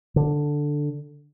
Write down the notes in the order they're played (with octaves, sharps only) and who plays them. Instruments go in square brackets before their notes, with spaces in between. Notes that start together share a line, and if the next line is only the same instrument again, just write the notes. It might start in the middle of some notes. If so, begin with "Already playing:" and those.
[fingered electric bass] D3